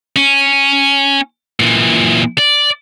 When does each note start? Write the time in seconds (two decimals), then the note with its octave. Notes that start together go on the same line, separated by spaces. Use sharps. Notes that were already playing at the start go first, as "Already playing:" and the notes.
0.16 C#4
1.60 A#2 E3
2.38 D5